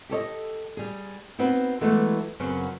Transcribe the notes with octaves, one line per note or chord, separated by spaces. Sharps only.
G4 A4 C#5 D#5
G3 G#4
B3 C4 D#4 F#4 B4
E3 F#3 G#3 A3 B3
F#2 C#3 F#3 B3 C4